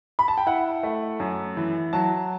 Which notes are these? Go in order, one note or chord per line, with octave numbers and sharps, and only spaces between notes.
B5
A5
G5
E4 F#5
A3
F#2
E3
F#3 A5